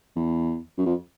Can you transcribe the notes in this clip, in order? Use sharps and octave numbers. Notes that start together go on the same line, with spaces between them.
E2
F#2
F2